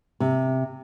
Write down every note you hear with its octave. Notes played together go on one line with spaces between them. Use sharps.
C3